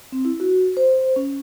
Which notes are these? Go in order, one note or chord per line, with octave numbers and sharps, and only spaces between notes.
C4
E4
F#4
C5
C#4